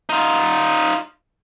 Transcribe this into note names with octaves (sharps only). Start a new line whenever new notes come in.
D#4 F4